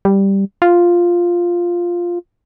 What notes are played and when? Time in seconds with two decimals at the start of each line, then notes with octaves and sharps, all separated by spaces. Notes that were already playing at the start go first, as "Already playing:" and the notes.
0.05 G3
0.62 F4